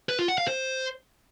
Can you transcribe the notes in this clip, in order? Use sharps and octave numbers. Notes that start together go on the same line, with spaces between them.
B4
F4
F#5
F5
C5